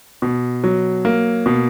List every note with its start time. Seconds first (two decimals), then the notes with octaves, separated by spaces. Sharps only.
0.22 B2
0.64 F#3
1.05 A#3
1.46 B2